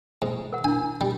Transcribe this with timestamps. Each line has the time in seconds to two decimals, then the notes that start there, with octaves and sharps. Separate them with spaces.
0.22 G#2
0.53 A#4 F#5
0.64 D4 E4 G#5
1.01 G3